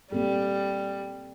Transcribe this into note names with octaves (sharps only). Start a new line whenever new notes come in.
G3 A#3 C4 A4